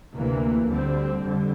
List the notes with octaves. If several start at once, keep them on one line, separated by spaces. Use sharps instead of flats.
D2 C3 E3 A#3
D2 D3 G3 C4
F2 D3 G3